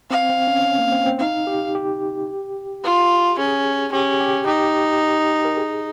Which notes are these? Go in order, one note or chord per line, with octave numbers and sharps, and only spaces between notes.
C4 F5
C4
C#4
C#4
A#3
C4
C#4
C4
D#4 F5
G4
G4
F4
C#4 G#4
C#4 G4
G4
D#4 G4
A#4
G#4